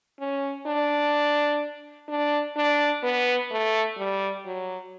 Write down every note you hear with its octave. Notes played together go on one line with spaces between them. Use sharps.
C#4
D4
D4
D4
B3
A3
G3
F#3